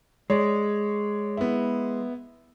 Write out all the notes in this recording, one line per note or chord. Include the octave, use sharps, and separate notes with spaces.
G#3 C#5 D5
B3 E4